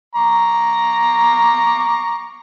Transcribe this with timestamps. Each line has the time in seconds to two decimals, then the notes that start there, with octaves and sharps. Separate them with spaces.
0.15 A#5 C#6 D6